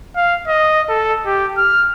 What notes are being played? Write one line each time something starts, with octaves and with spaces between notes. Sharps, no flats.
F5
D#5
A4
G4
F6